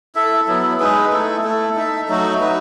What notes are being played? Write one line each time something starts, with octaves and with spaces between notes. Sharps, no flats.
E4 A4 E5
F#3 B3 E4
G#3 D#4 G#4 B4
A3 E4 A4
A3 E4 A4
D#4 A4 E5
F#3 A3 D#4 F#4
D#4 F#4 B4